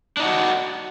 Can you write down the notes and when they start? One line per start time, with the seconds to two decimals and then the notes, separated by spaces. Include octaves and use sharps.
0.17 D4
0.20 D#4
0.23 F#5
0.25 F#4